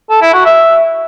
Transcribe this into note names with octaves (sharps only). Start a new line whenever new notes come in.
A4
E4
F#4
E5